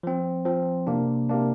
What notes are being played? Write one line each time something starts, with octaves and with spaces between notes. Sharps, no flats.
F3 C4
F3 C4
C3 A#3 D4
C3 A#3 D4